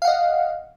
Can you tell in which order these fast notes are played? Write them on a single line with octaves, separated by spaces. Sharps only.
F5 F#5 D#5